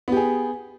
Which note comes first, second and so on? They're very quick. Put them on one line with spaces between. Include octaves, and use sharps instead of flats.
B3 G4 G#4